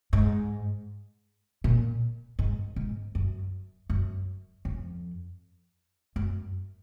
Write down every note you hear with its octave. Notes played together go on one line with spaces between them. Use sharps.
G#2
A#2
G#2
G#2
F#2
F#2
F2
F#2